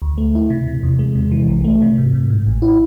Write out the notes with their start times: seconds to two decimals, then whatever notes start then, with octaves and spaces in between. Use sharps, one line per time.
0.02 D2
0.18 A3
0.35 E4
0.50 C3
0.67 C3
0.83 E2
0.99 G#3
1.15 C3
1.32 E3
1.48 B1
1.64 A3
1.82 C3
1.98 G#2
2.14 G#2
2.30 A2
2.46 A1
2.62 E4